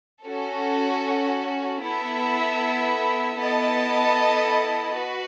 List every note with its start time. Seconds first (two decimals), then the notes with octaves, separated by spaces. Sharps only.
0.24 C#4 F#4 A4
1.81 B3 E4 A4 E5
3.38 B3 E4 A4 D#5 A5
4.96 F#4 B4